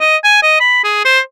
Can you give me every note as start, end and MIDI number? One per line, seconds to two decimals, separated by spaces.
0.01 0.17 75
0.24 0.42 80
0.43 0.57 75
0.60 0.83 83
0.84 1.01 68
1.05 1.20 72